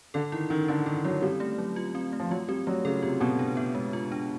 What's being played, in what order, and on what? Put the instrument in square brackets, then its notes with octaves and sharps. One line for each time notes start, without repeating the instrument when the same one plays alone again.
[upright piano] D3 [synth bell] A4
[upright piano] D#3 [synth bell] E4
[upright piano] D#3 [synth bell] C#4
[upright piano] D3 [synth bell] C#4
[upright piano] D#3 [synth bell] A4
[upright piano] F#3 [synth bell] E4
[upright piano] G3 [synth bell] C4
[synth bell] A3
F#3
F4
C4
A3
[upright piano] F3
[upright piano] F#3 [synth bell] F4
[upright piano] G3 [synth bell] C4
[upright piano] F#3 [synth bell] A3
[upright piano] C#3 [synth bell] A4
[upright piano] C3 [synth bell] F4
[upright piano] B2 [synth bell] C4
[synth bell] D4
B3
G#3
F4
D4